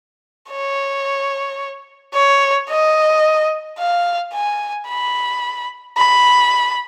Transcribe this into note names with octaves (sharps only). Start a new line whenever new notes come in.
C#5
C#5
D#5
F5
G#5
B5
B5